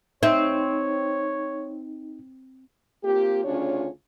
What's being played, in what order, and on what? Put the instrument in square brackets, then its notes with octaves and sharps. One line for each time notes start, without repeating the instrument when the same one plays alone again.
[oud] C4 [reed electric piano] D#4 [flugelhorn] C#5 [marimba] E5
[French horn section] A#3 C4 F4 G4
D2 C#3 C#4 D4 F4 C#5